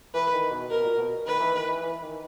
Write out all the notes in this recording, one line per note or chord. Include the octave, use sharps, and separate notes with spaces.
E3 B4
D#3
B2
B2 A#4
A#2
B2
D#3 B4
E3
D#3
E3
E3
D#3